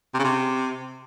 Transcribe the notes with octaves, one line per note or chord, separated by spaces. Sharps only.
C3
C#3
C3